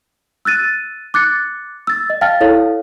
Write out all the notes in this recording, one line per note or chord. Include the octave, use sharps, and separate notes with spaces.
E6 F#6 A6 D#7
D6 F#6 A6 C#7
E6 A6
D#5
F5 G5 A5 F6 A6
E4 A4 C#5 F5